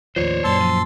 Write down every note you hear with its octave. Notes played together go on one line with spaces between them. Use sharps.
A1 D#2 F3 C5 C#5
F#2 A#2 A5 C6 E6
F3